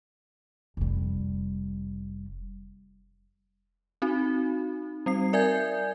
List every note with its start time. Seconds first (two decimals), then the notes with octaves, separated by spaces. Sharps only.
0.77 F1 G3
4.02 C4 D#4 F#4
5.06 G3 C4 C7
5.33 A#4 D5 E5 G#5 G6 G#6